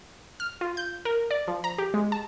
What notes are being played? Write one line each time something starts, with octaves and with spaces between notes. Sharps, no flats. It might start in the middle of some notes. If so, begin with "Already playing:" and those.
F6
F4
G6
A#4
D5
F3
A#5
G4
G#3
A5